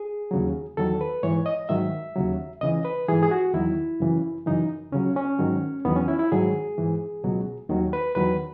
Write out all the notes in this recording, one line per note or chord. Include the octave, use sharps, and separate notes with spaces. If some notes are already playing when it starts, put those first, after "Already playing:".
Already playing: G#4
D#2 C#3 F#3
E2 D#3 F#3 A4
B4
G#2 E3 C#5
D#5
G#2 D#3 F#3 E5
D#2 C#3 F#3
C#2 C#3 E3 D#5
B4
G#2 E3 G#4
G#4
F#4
E2 D#3 F#3 E4
F#2 C#3 E3
F#2 C#3 E3 D#4
C#2 C#3 F#3 C#4
C#4
G#2 D#3 F#3
E2 D#3 F#3 B3
C#4
E4
E4
G#2 D#3 F#3 G#4
G#2 E3
C#2 B2 F#3
D#2 D#3 F#3
B4
E2 D#3 F#3 B4